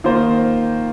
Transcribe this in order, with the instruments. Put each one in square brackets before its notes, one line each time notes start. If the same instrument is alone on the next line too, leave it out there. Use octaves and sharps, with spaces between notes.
[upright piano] D#3 A#3 F4 C5